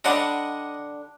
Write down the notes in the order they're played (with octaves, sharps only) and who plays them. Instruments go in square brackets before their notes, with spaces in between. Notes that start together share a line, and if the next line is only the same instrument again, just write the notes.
[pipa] D3 G3 D4 [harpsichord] D#5 F#5